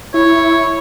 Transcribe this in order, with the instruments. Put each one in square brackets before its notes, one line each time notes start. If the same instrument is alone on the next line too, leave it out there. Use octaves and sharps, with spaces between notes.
[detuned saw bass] E4 [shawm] C#5